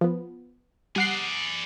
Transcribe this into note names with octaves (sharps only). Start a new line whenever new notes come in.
F3 B3
G3 G#4 D5 F#5 C7